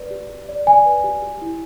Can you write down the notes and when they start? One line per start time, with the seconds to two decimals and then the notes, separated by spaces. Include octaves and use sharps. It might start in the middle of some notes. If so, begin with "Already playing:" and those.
Already playing: B4 D5
0.11 G4
0.30 G4
0.49 D5
0.66 D5 G#5
0.86 B4
1.04 G4
1.22 G4
1.41 E4